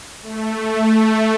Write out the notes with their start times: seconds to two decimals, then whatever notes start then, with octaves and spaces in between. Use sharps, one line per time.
0.22 A3
0.52 A3